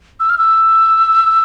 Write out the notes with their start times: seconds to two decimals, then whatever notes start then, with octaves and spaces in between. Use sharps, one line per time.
0.20 E6
0.29 F6
0.38 E6